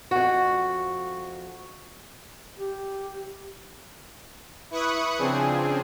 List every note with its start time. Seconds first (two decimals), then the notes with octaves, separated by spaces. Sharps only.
0.11 F2 F#4
2.59 G4
4.71 E4 B4 C#6 D#6 F#6 C#7
5.18 C#3 F3 C4 D4 G#4